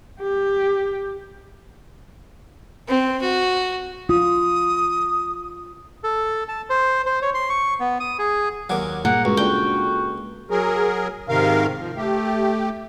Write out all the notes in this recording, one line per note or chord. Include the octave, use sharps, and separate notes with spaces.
G4
C4
F#4
F4 D#6
A4
A5
C5
C5
C#5
C6
C#6
B3
D#6
G#4
D#2 F#3 F#5 G#5 D6
G2 A#2 A#3 G#4 F#5
C#2 F#4
D4 F4 A4 G5
F#3 G#4 A#4
G#2 C3 D#3 A#4 F5
F3
A3 G4